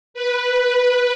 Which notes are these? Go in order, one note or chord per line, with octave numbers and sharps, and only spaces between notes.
B4